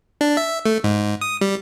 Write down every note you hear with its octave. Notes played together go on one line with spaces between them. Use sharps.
D4
E5
A3
G#2
D#6
G3